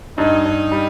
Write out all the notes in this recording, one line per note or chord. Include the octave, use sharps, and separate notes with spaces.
G2 D#4
G2
G3